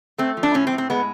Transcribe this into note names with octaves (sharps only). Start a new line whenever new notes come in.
A3 C4
F3
D4
A2 C#4
C4
A2
C4
G#3 B3